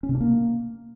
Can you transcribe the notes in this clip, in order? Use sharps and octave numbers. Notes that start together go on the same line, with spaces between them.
C#4
C3
D4
A#3